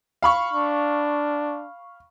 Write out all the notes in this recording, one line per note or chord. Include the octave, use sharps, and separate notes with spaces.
F5 B5 C#6
D4